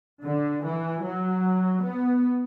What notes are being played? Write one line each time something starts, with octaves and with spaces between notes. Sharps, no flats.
D3
E3
F#3
B3